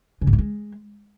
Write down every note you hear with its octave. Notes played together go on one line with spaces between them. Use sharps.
C#3
G#2
F#3
G#3